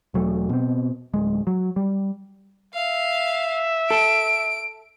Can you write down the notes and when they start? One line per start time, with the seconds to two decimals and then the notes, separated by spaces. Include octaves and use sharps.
0.14 E1 F#3 A3
0.49 B2 C4
1.14 D1 G#3
1.47 F#3
1.76 G3
2.74 E5 F5
3.91 A4 D7